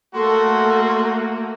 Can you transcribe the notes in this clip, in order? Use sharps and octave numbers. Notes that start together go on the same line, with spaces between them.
A3 A#3 F#4 A4 C6